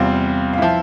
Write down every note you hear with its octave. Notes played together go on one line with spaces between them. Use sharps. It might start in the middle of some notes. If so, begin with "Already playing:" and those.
Already playing: E2 C3 G3 C4 F4 F5
F5
F3 E4 E5